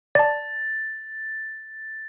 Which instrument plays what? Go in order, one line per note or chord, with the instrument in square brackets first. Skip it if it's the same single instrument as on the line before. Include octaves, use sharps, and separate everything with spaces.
[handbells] D5 A5 [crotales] A6